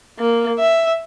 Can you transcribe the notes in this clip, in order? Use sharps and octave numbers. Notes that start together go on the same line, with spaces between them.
A#3
E5